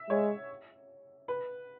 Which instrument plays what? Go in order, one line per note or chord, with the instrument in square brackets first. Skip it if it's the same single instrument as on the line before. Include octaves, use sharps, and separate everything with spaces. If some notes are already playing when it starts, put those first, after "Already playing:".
Already playing: [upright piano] E5
[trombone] G#3 [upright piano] C#5
[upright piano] B4